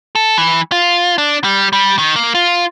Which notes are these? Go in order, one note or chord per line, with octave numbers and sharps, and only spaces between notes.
A4
E3
F4
D4
G3
G3
D#3
A#3
F4